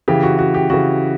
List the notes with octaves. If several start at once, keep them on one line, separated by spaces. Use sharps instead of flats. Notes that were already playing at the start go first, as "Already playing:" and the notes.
C#3 E3 G4
F#4
F#4
G4
C#3 E3 F#4